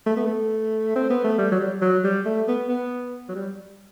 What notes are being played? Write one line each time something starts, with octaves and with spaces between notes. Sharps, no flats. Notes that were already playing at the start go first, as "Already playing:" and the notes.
A3
B3
A3
C4
B3
A3
G3
F#3
G3
F#3
G3
A3
B3
B3
F#3
G3